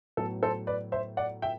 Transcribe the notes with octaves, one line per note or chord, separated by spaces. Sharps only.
A2 F#3 B3 A4
A4 C5
B4 D5
C5 E5
D5 F#5
E5 G5